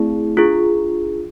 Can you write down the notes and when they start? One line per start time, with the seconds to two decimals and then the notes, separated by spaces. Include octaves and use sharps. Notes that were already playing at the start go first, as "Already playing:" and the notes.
Already playing: A3 C4 E4 G#4
0.37 D4 F4 G#4